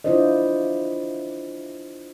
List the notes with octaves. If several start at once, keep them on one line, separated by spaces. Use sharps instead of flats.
D4 E4 F4 C5 D5 D#5